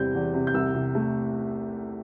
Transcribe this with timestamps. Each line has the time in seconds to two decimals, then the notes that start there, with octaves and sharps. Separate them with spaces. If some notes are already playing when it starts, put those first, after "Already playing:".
Already playing: E2 C3 G3 C4 G6
0.14 E2
0.34 C3
0.47 G6
0.54 C2 E6
0.74 C3
0.95 A3